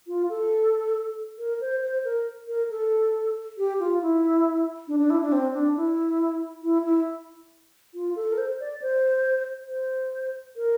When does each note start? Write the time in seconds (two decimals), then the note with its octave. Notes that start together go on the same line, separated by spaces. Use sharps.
0.07 F4
0.30 A4
1.38 A#4
1.61 C5
1.83 C5
2.05 A#4
2.48 A#4
2.70 A4
3.58 G4
3.79 F4
4.02 E4
4.88 D4
4.99 D4
5.10 E4
5.22 D4
5.32 C4
5.54 D4
5.76 E4
6.63 E4
6.85 E4
7.94 F4
8.16 A4
8.32 A#4
8.38 C5
8.60 D5
8.82 C5
9.69 C5
10.57 A#4